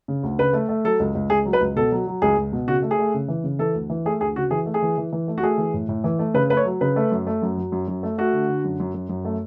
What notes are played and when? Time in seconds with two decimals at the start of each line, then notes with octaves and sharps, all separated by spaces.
0.08 C#3
0.23 D2
0.39 C#3 B4
0.53 A3
0.69 A3
0.84 F#3 A4
1.00 C#2
1.15 C#2
1.30 C#2 G#4
1.45 F#3
1.53 B4
1.61 C#2
1.76 B2 A4
1.92 F#3
2.07 F#3
2.22 C#2 G#4
2.37 C#2
2.52 B2
2.67 C#3 F#4
2.82 A3
2.91 G#4
2.99 A3
3.14 C#3
3.28 E3
3.44 C#3
3.59 E3 A4
3.74 D2
3.90 E3
4.06 A3 G#4
4.21 D2 G#4
4.36 C#3 F#4
4.51 E3 G#4
4.66 A3
4.74 G#4
4.82 E3
4.98 E3
5.12 E3
5.28 A3
5.38 F#4
5.43 A3 G#4
5.58 E3
5.74 A2
5.89 A2
6.04 E3
6.19 A3
6.34 C#3 B4
6.50 A3 B4
6.57 C#5
6.65 F#3
6.81 C#3 B4
6.96 A3
7.11 F#2
7.27 A3
7.42 F#2
7.58 F#3
7.72 F#2
7.88 F#2
8.03 A3
8.18 A3 F#4
8.33 D3
8.48 D3
8.64 F#2
8.80 F#2
8.94 F#2
9.09 F#2
9.25 A3